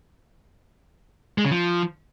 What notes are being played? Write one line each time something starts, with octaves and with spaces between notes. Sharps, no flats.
G#3
C#3
F3